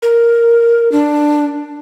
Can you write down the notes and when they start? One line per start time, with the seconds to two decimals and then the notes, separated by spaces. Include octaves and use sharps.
0.02 A#4
0.92 D4